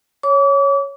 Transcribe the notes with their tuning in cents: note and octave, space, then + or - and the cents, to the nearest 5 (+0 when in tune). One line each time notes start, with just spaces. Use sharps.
C#5 +0 D6 -40